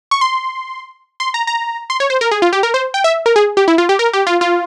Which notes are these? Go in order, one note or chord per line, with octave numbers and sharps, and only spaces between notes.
C#6
C6
C6
A#5
A#5
C6
C#5
C5
A#4
G#4
F4
G4
A#4
C5
G5
E5
A#4
G#4
G4
E4
F4
G4
A#4
G4
F4
F4